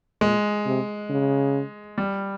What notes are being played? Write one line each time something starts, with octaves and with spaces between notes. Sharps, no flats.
A#2 G#3
C3
C#3
G3